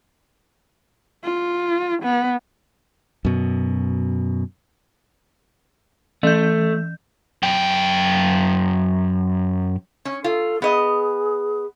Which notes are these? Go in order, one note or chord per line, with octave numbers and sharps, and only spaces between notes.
F4
B3
F#2 B2
E3 A3 G6
F#2 G5
C#4
F4 A4
B3 G#4 D#5